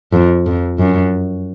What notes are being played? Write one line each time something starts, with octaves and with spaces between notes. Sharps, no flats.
F2
F2
F#2